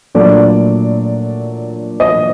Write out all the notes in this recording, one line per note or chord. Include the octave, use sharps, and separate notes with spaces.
A#2 F#3 A3 D4 D5
D#5